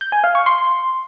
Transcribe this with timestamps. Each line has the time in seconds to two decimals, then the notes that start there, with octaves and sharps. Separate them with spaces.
0.01 G6
0.12 G#5
0.24 F5
0.35 C#6
0.46 C6